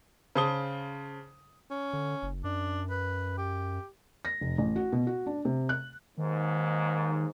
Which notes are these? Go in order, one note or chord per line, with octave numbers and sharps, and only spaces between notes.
C#3 C5 A5 D#6 G7
C#4
D3
F#1
F#2 D4
B4
G4
A#6
F1
A1
F#4
B2
F#4
D4
C3
F#6
D#2 G#2 D#3